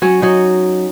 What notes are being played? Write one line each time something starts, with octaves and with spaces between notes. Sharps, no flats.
F#3 C#4
F#3 D#4